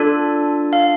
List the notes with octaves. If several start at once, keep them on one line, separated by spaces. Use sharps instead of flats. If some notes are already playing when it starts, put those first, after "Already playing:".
Already playing: D4 F4 A4 D5
F5